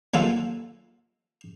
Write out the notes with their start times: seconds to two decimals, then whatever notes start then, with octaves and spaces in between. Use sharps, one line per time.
0.14 D#2 F#3 F4 A4